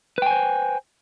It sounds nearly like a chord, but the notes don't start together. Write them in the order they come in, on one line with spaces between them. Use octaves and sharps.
B4 G5 G#5 C5